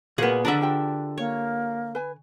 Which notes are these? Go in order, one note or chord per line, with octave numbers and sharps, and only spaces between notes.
A#2 B3 F#4 G#4 A#4 F#5
D3 D4 A#4 B4 E5 A5
F4 G4 G5
A#3 C#5
B4 G#5